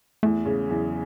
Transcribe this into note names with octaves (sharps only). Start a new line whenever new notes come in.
E2 A3
C#3
E2 F#3